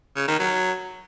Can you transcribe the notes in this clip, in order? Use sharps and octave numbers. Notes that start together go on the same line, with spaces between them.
C#3
D#3
F#3